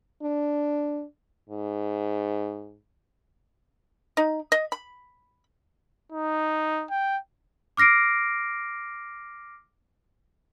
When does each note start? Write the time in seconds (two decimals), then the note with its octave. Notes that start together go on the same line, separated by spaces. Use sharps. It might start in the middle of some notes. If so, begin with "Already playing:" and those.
0.23 D4
1.49 G#2
4.17 D#4
4.52 D#5
4.72 B5
6.12 D#4
6.90 G5
7.77 D6 F6 A#6 C7 D7